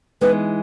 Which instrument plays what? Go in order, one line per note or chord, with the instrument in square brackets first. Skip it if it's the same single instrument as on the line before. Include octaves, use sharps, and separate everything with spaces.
[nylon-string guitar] E3 G#3 B3 D#4 [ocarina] B4